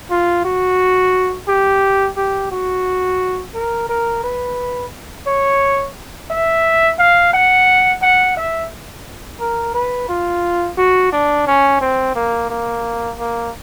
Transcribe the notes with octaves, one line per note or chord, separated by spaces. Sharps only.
F4
F#4
G4
G4
F#4
A#4
A#4
B4
C#5
E5
F5
F#5
F#5
E5
A#4
B4
F4
F#4
D4
C#4
C4
A#3
A#3
A#3